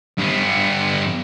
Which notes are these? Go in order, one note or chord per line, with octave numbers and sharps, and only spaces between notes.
G2 B3